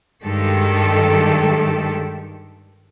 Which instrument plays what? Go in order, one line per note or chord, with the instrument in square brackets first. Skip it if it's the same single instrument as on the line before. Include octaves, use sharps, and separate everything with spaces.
[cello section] G2 D#3 G#3 G4 A4